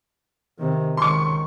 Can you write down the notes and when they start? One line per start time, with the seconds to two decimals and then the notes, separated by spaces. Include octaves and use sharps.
0.59 C3 D#3
0.97 C#2 D#3 C6 C#6